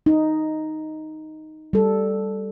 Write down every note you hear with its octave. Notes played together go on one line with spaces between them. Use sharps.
D#4
G3 A4